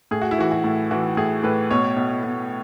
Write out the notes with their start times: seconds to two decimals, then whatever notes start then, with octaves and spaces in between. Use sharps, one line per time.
0.11 A2 G#4
0.22 F#4
0.31 E4
0.38 E3 F#4
0.52 F#4
0.64 A2
0.91 E3 F#4
1.17 A2 G#4
1.43 A2 B4
1.71 B2 C#5
1.97 B2
2.23 B2